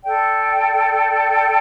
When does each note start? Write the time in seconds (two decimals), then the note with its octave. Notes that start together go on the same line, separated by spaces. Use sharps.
0.03 A4 D5 G5